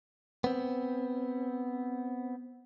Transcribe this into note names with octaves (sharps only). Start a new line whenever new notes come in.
B3 C4